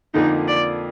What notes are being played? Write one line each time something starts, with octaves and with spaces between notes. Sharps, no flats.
F2 D3 F3 A#3 D#4
D5